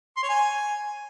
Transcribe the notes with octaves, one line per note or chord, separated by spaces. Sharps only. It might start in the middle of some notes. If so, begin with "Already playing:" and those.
C6
C#5
G#5